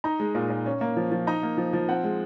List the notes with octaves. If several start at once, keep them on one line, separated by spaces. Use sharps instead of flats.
D#4 A#5
G#3
A#2
A#2
C#4
A#3
F3
F3
D#4 A#5
A#3
F3
F3
C4 F#5
G#3